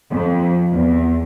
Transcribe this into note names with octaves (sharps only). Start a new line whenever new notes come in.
F2
E2